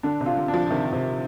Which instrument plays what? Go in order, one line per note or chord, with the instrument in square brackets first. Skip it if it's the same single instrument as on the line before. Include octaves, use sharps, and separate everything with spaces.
[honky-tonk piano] D3 [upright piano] D4
[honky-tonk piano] C3
[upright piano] F4
[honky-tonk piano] D3
[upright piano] D4
[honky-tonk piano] F3
[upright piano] C3 [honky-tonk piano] D#3
[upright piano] C3